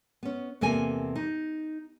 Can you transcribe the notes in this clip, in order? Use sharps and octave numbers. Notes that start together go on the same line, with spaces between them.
B3 C#4
E2 C3 A#3 A4 G#5
D#4